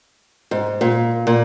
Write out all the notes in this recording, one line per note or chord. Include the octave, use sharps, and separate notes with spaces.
G#2
A#2
A#2